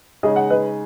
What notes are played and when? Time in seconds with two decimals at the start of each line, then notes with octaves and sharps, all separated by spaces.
0.23 C#3 G#3 D#4 G#4 D#5
0.36 F#5
0.50 B4 D#5